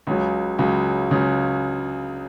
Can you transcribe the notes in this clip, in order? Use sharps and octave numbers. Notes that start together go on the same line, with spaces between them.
C#2 C#3 F#3
C#2 C#3 F#3
C#2 C#3 F#3